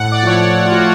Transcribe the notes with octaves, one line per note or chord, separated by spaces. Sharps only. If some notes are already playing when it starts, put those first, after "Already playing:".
Already playing: A2 F#5
D5
F3 A3 C#5
D5
A2
F4
F#4